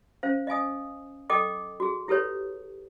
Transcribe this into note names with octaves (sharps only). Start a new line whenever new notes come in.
C#4 C5 F5
D#5 F5 G#5 D#6
A4 D#5 G5 D6
F#4 G#4
E4 G4 A4 B4 C#5